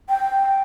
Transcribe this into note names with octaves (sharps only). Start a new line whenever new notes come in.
G5